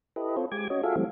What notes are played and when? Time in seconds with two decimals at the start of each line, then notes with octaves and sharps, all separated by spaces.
0.16 E4 G4 A4 B4 D#5
0.37 C4 F4 A4 C5 C#5
0.52 G#3 G4 G#5 D6 G#6
0.70 C#4 F#4 C#5 D#5
0.83 F4 F#4 G#4 A4 E5 F5
0.96 E3 F#3 G3 A3 C4